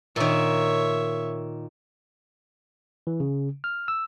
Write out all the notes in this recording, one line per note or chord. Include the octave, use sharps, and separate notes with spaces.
A#2 D#3 C#5 E5
E3
C#3
F6
E6